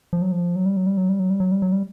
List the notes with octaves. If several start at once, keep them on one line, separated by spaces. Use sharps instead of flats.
F3
F#3
F3
F#3
G3
F#3
G3
F#3
G3
F#3
G3
F#3
G3
F#3
G3